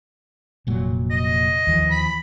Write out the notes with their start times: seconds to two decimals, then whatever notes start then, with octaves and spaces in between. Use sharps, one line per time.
0.67 F1 A#2 F#3
1.11 D#5
1.67 D#2 E3 F3
1.91 B5